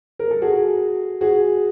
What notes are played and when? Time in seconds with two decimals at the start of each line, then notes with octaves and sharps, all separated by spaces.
0.19 A#4
0.31 A4
0.42 F#4 G#4
1.21 F#4 G#4